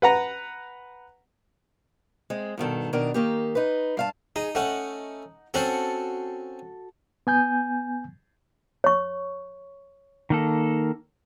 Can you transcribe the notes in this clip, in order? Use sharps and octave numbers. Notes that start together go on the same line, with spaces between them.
B4 F#5 A#5
G#3 C4
G2 B2 D#3 A4
B2 D#3 D4 A#4
D#3 A#3 G4
D#4 B4
G2 F5 A5
D#4 G#4
A3 C#4 D#4 F#5
C4 C#4 F#4 A4 C5 F#5
B3 G#5 G6
C#5 C#6
D#3 A#3 A4